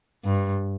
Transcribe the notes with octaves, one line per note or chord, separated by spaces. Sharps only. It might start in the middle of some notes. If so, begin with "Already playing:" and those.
G2